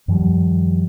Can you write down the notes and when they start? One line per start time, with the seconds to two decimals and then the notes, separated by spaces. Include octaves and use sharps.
0.08 F#2 D#3 F3 G3